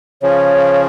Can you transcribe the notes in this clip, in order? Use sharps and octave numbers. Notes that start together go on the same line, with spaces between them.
C#3 F3 C#5